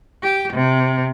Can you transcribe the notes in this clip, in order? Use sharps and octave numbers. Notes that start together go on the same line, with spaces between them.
G4
C3